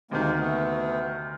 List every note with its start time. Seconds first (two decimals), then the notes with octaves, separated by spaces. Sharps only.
0.11 D2 C3 D#3 G#3 A#3
0.39 A3 B3